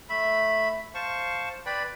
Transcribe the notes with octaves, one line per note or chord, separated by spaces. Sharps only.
A3 E5 B5
C5 F5 A5 C#6
B4 D5 G5 B5